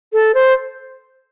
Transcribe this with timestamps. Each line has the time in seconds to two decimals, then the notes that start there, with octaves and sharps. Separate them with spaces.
0.13 A4
0.34 C5